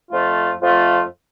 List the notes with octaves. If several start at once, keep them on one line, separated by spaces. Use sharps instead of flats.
F2 F3 A3 F4
F2 F3 A3 F4